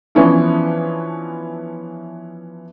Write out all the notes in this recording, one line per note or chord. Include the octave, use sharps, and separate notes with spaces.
E3 F3 B3 C#4 D4 E4